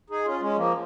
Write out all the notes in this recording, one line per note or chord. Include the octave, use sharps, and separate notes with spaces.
D#4 G#4
C#4 F4
G#3 C#4
F3 A#3